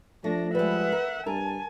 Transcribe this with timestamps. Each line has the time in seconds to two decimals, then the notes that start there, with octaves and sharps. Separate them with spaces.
0.24 F3 A3 D4 A#6
0.55 G3 G#3 B4 E5 F#5
0.92 A#4
1.26 G2 A#4 G#5 A5